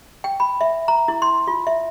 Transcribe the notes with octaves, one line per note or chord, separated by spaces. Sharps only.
G5
B5
E5
A#5
E4
C6
F4
E5